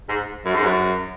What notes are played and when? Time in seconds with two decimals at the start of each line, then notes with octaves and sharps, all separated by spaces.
0.09 G#2
0.45 F#2
0.55 G#2
0.65 F#2